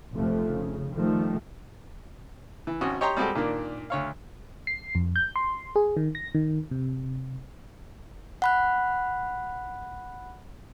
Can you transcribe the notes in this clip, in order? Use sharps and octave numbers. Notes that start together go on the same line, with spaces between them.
F1 F2 C3 F3 A3
C#3
D#3 F3 G3 A3
E3
G#1 C#4 F#4 D#6
G4 C#5 D#5 G5 A#5 C6
G3 G#3 C4 F#4 G4 A4
A#2 D#3 A#3 D4
D2 C#5 F5
C7
F2
G6
C6
G#4
D#3
A#6
D#3
C3
F#5 B5 F#6